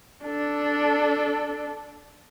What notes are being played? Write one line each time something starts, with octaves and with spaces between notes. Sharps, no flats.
D4 A4